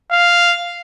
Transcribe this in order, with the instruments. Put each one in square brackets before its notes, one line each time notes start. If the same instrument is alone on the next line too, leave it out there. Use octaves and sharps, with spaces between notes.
[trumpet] F5